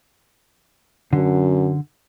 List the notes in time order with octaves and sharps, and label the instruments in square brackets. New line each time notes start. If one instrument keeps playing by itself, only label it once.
[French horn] F#2 [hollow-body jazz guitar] D3